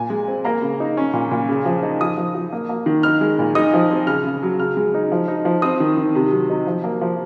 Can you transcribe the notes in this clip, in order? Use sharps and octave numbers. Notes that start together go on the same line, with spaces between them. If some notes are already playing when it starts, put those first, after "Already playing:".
Already playing: A#2 G#5
G#3
C4
A#3 A#5
C#3
D#4
C#4
A#2
A#2
C#3
F3
D#4
F3 D#6
F3
F3
A#3
A#3
D#3
D#4 F6
G#3
A#2
D#4 D#6
F3
C4
C#3 F6
C#3
F#3
C#3 F6
G#3
D#4
F3
D#4
F3
C4 D#6
D#3
D#3
C3
F#3
D#4
F3
A#3
F3